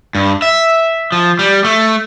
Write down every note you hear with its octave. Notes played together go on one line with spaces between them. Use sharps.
G2
E5
F3
G3
A3